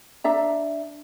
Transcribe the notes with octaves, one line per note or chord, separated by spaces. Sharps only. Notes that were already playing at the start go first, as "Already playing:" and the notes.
D4 E5 A#5